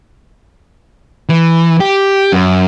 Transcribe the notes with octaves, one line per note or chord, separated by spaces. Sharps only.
E3
G4
F#2